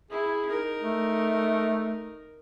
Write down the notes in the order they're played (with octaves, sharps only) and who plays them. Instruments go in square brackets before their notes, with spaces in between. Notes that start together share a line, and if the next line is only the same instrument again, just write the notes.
[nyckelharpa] E4 [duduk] G#4
[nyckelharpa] D#4 A#4
[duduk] A3